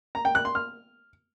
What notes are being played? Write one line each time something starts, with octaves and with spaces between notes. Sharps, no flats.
A#5
G5
F#6
C6
F6